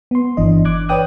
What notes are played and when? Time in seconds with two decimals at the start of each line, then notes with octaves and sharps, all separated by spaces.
0.11 B3 C6
0.37 G1 E3 D4 D#5
0.65 D6 F#6 G#6
0.89 B4 C#5 D5 G5 D#6 F#6